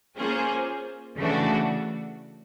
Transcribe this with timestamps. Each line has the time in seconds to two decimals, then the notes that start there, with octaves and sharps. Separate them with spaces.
0.17 A#3 C#4 F4 G#4 C5
1.17 C#3 E3 A3 D4 F#4